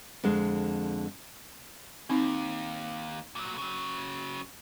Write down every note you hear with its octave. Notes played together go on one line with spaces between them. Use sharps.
F2 D3 G#3
D#2 C4 D#4
A#2 F#3
C#3 F#3